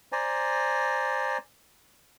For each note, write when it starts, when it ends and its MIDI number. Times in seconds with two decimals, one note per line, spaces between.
0.12 1.38 72
0.12 1.38 74
0.12 1.38 80
0.12 1.38 82